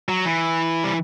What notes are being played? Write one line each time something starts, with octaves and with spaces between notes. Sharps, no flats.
F#3
E3
G3